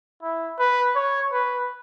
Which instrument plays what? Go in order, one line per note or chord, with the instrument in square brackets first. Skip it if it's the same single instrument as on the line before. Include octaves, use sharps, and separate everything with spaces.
[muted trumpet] E4
B4
C#5
B4